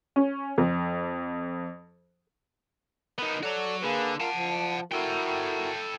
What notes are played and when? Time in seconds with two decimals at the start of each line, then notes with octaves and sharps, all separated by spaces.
0.16 C#4
0.58 F2
3.18 B3 D#4 A#4
3.43 F#4 A4 C#5 D5
3.82 D3 A#3 G#4 B4
4.20 F4 A#4 F5 F#5 A5
4.34 F3
4.92 E4 F#4 A4 A#4 G5